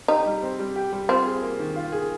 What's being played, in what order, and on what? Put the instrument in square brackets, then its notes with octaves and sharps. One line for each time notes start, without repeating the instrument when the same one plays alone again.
[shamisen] D#4 [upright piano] G4
[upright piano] G3
C4
G3
G4
G3
[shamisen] C4 [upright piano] F4
[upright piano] G#4
A#3
D#3
F4
G#4